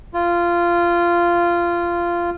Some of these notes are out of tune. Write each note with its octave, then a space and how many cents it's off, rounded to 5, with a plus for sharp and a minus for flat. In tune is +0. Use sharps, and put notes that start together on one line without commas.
F4 -15